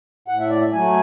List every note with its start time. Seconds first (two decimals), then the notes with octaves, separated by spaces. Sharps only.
0.28 A2 F#5
0.39 E5
0.49 D5
0.61 E5
0.73 F#3 A3 G#5